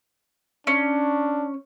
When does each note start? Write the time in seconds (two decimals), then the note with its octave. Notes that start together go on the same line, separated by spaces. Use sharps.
0.67 C#4 D4